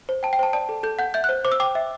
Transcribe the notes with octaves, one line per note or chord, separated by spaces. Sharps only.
C5
G5 A5
G5
C5 A5
D5 A5
A4
A4 G6
F#5 G6
E5 G6
F#6
C5
C5 D6
E6
G5 D6
E5